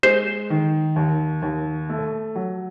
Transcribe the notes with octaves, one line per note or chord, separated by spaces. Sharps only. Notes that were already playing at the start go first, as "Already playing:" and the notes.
G#3 C5
D#3
D#2
D#2
A3
F#3